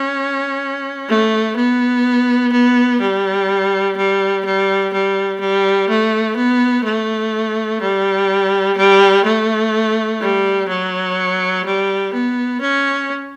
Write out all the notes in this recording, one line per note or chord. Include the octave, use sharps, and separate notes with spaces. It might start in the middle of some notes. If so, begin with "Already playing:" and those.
Already playing: C#4
A3
B3
B3
G3
G3
G3
G3
G3
A3
B3
A3
G3
G3
A3
G3
F#3
G3
B3
C#4